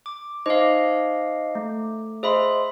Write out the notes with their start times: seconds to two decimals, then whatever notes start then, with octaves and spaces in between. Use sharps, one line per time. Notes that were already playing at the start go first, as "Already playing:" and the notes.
0.06 D6
0.46 D#4 C5 D#5 F5 D6
1.55 A3
2.23 G#4 C5 D#5 E5 B5 C6